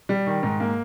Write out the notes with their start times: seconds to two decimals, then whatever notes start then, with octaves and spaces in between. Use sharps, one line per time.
0.09 G3
0.27 D#3
0.43 G#2
0.60 A#3